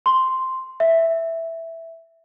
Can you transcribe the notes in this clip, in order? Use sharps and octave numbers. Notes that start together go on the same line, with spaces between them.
C6
E5